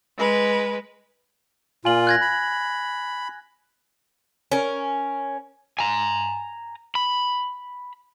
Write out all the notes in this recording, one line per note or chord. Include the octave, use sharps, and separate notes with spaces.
G#3 B4
A#2 F4 G#5 F#7
F#6 G#6 A#6
B5
C#4 A#4
G#5 A#5
B5